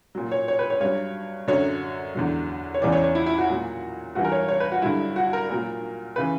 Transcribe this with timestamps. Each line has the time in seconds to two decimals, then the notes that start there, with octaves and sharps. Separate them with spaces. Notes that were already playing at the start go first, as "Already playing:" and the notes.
0.15 A#2 F#3
0.31 C#5
0.48 C#5
0.59 B4
0.70 C#5
0.80 G2 F#3 C#5
1.48 F#2 D3 F#3 C#5
2.14 E2 D3 F#3
2.74 C#5
2.82 E2 C#3 E3 D5
2.92 C#5
3.04 C#5
3.15 E4
3.26 E4
3.38 F#4
3.49 A#2 F#3
4.15 G2 E3 F#4
4.25 A#4
4.32 C#5
4.48 C#5
4.60 B4
4.72 F#4
4.82 G2 D3 F#3 E4
5.16 F#4
5.33 A#4
5.49 A#2 F#3 A#4
6.16 C#3 E3 B4